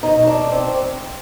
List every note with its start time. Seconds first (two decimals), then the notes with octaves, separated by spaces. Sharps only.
0.03 B2 D#4
0.27 D4
0.52 C4